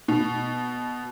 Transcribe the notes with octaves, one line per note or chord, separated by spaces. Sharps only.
B2